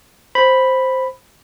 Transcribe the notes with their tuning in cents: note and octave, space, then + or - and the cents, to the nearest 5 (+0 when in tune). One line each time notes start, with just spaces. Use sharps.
C5 +0 B5 +0